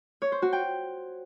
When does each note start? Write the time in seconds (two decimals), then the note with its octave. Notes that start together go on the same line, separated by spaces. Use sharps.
0.22 C#5
0.32 C5
0.42 F#4
0.53 G5